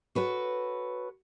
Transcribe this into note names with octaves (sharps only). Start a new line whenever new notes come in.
F#4 A4 B4 C#5